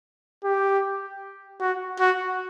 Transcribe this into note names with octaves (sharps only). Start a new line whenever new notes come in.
G4
F#4
F#4